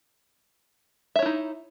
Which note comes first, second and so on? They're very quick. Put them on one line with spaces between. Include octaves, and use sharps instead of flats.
E5 C#5 E4 D#4